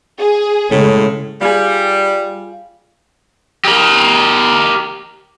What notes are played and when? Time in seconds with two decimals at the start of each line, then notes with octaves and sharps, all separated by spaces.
0.18 G#4
0.71 A2 C#3 G#3
1.41 G3 F4 G#4
3.65 G4 A#4